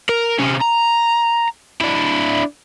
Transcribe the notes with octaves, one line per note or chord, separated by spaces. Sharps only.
A#4
C3 C#4
A#5
D4 E4